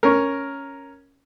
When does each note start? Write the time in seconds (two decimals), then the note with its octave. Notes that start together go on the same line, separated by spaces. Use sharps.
0.03 C#4 A#4